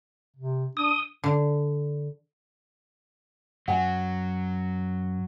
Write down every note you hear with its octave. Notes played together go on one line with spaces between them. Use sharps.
C3
D4 D#6
D3
F#2 F#3 F#5 G#5